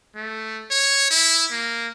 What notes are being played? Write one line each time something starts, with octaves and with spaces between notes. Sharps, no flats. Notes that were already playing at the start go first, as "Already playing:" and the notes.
A3
C#5
E4
A#3